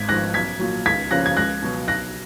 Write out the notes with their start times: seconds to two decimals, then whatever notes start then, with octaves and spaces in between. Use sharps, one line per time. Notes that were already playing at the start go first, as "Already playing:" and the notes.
Already playing: G#1 G#6 B6
0.09 G#2 F3 F#6 A#6
0.34 B1 G#6 B6
0.59 A#2 F#3
0.86 C#2 G#6 B6
1.11 C#3 F3 A#3 C#4 F#6 A#6
1.26 G#6
1.37 C#2 F#6 A#6
1.62 B2 F#3
1.88 B1 F#6 A#6